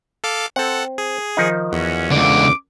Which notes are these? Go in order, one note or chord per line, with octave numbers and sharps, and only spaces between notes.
A4 F5 D6
C4 A4 F#5
G#4
D#3 F3 D#4
E2 C#4 F#4
C#2 D3 D6